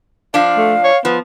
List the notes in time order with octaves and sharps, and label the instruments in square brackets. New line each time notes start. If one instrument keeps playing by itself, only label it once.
[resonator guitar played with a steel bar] F3 D4 [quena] F5
[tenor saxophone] A3
C#5
[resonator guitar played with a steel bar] F3 [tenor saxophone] B3